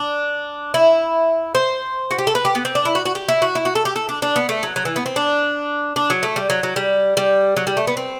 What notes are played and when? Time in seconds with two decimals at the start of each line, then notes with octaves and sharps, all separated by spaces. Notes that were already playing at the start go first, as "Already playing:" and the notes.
Already playing: D4
0.74 E4
1.55 C5
2.11 F#4
2.19 G4
2.27 A4
2.35 B4
2.45 G4
2.55 B3
2.65 C4
2.75 D4
2.85 E4
2.95 F#4
3.05 F#4
3.15 G4
3.29 E4
3.42 F#4
3.55 E4
3.65 F#4
3.75 A4
3.85 G4
3.96 A4
4.09 D4
4.22 D4
4.36 B3
4.49 A3
4.63 F#3
4.76 F#3
4.85 E3
4.96 B3
5.06 C4
5.16 D4
5.96 D4
6.10 F#3
6.23 A3
6.36 G3
6.50 F#3
6.63 F#3
6.76 G3
7.17 G3
7.57 F#3
7.67 G3
7.77 A3
7.87 B3
7.97 C4